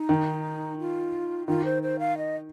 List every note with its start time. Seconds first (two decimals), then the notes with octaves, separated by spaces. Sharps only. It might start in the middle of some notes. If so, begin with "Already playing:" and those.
Already playing: D#4
0.09 D#3
0.79 F4
1.47 D#3 F4
1.65 C5
1.83 C5
1.99 F5
2.18 D#5